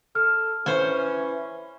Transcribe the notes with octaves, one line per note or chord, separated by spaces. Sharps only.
A4 F6
E3 C#4 C5 C#5 G#5